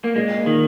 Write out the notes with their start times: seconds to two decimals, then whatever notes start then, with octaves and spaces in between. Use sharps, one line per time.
0.04 A#3
0.16 A#2 G#3
0.39 A#3
0.46 D#3